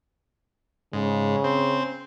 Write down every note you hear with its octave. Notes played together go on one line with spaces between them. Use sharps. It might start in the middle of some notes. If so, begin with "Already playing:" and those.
G#2 C#3
C4